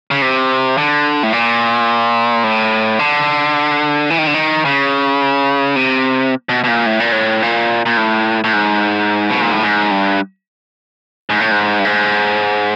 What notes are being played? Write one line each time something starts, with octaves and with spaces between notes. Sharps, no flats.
C#3
C3
D3
A2
A#2
A2
D3
E3
D#3
D3
D#3
C#3
C3
B2
B2
A#2
A2
A#2
A2
A#2
A#2
A2
A2
G#2
B2
A#2
A2
G#2
G2
G#2
A2
G#2
G2
G#2